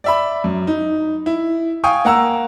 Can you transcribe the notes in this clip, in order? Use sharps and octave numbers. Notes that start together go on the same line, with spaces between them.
D5 E5 B5
F#2
D#4
E4
F5 G5 G#5 C#6 D#6
A#3 F#5 A#5 E6